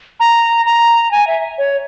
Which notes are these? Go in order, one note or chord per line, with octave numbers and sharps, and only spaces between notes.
A#5
A#5
G#5
E5
C#5